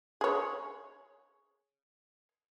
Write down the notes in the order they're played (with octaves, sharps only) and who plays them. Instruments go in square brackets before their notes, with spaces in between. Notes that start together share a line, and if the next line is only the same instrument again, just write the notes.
[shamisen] G#4 C#5